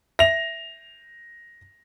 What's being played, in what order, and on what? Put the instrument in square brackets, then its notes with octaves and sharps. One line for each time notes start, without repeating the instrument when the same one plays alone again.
[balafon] E5 [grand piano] A#6 F7